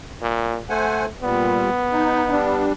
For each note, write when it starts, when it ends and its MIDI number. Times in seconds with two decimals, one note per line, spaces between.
0.22 0.59 46
0.70 1.08 57
0.70 1.06 72
0.70 1.06 78
0.70 1.06 80
1.22 1.70 46
1.22 1.70 55
1.22 2.67 59
1.92 2.30 63
2.31 2.73 55
2.31 2.73 62